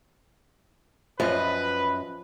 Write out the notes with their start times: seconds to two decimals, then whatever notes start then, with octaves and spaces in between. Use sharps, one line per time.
1.20 F#2 F3 B4 D#5